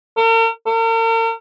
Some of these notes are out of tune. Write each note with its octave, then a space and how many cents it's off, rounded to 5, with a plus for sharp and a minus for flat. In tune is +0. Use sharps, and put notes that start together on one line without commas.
A#4 -45
A#4 -45